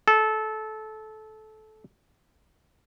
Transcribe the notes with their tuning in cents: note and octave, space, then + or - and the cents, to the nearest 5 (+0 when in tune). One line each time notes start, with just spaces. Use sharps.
A4 -20